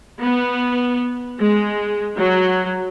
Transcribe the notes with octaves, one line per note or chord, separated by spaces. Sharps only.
B3
G#3
F#3